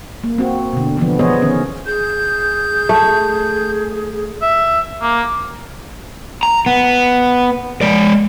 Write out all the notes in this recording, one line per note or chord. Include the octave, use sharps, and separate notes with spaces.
A#3
C4 F#4
B2 D3
D3 E3 F3 B3
E3 B3 G#4 C5 C#5 D#5
D#3 C#4
G#4 G6
A3
E5
A#3
A#5
B3
G#3 D5